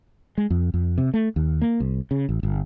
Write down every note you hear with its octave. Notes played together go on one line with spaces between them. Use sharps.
G#3
F2
F2
C3
A3
D#2
A#3
C2
C#3
A1
G1